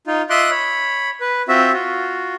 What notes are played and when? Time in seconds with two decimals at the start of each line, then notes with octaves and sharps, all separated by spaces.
0.07 D#4 F4
0.30 F4 D#5 E5 C6 D6 F#6
0.51 C#5 B5
1.21 B4
1.48 C4 F4 F#4 E5
1.73 F4 F#4